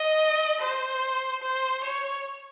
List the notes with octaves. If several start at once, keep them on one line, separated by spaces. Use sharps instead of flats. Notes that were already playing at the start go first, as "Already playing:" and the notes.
Already playing: D#5
C5
C5
C#5